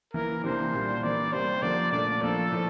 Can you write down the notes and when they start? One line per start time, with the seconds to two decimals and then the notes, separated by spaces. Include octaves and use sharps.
0.14 E3 A#3 E4 A#4
0.44 C3 E3 A#3 D4 C5
0.73 A#2 G3 D4
1.03 E3 A#3 E4 D5
1.32 C3 G3 A#3 C5
1.62 D3 F3 A#3 D4 D5
1.92 A#2 A3 D4 D5
2.22 F3 A#3 D4 A4
2.52 A2 F3 A3